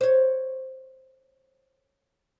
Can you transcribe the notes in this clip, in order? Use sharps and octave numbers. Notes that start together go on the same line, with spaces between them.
C5 C#5